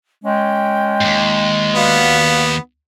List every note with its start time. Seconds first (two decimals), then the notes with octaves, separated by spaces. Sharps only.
0.24 G#3 C#4 G5
1.01 D#2 G#2
1.75 B3 F#4 D5 F5